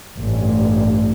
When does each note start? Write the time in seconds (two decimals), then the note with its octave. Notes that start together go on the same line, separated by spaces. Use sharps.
0.19 A1 G2